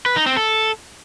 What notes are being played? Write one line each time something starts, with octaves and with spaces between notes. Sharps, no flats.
B4
D#4
C4
A4